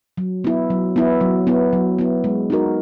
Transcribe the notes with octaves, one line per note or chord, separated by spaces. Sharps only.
F#3
B3 E4
F#3
B3 E4
F#3
B3 E4
F#3
B3 E4
G#3
D#4 F#4 A#4